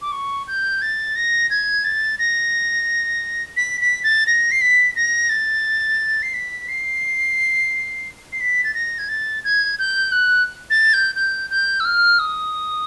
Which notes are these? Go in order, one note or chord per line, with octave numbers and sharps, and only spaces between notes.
D6
C#6
G6
A6
A#6
G#6
A6
A#6
B6
B6
A6
A#6
C7
B6
A#6
A6
C7
B6
C7
C7
B6
A6
A#6
G#6
A6
G#6
G6
F#6
A6
G6
G6
G6
E6
F6
D#6